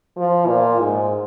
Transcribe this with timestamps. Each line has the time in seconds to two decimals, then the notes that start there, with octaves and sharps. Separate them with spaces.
0.17 F3
0.47 A#2
0.79 G#2